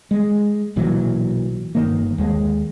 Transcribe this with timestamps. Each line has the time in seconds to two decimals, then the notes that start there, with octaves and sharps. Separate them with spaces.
0.11 G#3
0.76 B1 A#2 E3 F#3
1.75 G1 D#3 A#3
2.18 D#2 G#3